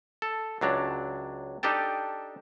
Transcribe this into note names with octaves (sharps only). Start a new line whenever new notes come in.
A4
C#2 F#3 D4 A#5
D4 D#4 G4 A4 G5 A5